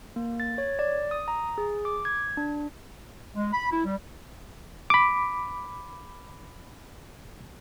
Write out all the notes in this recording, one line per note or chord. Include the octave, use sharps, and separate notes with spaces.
A#3
A6
C#5
D5
D#6
A#5
G#4
D6
G#6
D4
G#3
B5
E4
G3
B5 D6